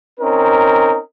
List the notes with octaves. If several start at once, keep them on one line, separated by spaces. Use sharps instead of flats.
C4 C#4 D#4 A#4